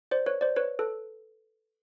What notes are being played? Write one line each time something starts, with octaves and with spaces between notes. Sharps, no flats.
C5 D5
B4 C#5
C5 D5
B4 C#5
A4 B4